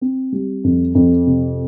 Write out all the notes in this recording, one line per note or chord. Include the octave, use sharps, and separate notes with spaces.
C4
G3
F2
F2
C3